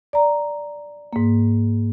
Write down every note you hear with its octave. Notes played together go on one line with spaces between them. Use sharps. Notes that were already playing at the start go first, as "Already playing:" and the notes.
D5 A#5
G#2 A#3